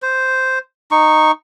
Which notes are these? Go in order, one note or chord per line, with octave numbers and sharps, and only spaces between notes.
C5
D#4 C#6